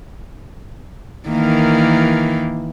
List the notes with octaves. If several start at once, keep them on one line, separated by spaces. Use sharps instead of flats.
D#3 E3 A#3